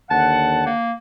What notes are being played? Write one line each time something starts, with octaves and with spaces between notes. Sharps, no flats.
D#2 D3 F#5 A5
A#3